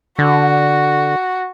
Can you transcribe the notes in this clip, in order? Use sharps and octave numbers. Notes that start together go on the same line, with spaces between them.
D3 F#4